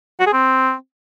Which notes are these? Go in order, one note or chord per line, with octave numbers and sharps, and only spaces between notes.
F#4
G#4
C4